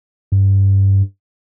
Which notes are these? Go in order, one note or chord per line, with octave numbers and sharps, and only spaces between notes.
G2